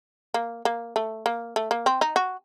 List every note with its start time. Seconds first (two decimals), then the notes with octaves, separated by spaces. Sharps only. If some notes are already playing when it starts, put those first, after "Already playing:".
0.34 A#3
0.65 A#3
0.96 A3
1.26 A#3
1.56 A3
1.71 A#3
1.86 C4
2.01 D#4
2.16 F#4